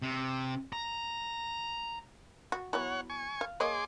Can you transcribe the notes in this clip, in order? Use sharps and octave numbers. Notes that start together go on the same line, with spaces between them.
C3
A#5
F#4
E3 F#3 B3 C#5 F#5
G#5 C#6
F5
A#3 G#4 C#5 D#5 C6 D6